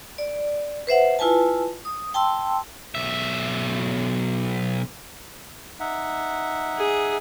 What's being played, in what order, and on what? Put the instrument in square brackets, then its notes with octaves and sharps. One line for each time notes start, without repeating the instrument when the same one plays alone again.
[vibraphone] D5
B4 C5 E5 F#5
E4 F4 B4 G#5 A5
D#6
G5 A5 C6 E6
[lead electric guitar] B1 E5
[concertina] D#4 E5 F#5
[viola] G#4